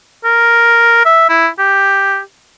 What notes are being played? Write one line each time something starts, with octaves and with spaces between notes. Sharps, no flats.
A#4
E5
E4
G4